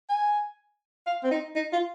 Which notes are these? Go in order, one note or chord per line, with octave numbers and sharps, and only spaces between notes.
G#5
F5
C4
D#4
D#4
F4